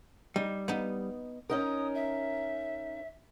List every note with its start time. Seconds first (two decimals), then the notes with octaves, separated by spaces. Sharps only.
0.36 G3 D#4
0.68 B3 D#4
1.50 C#4 D#4 A#4 D#6
1.95 E5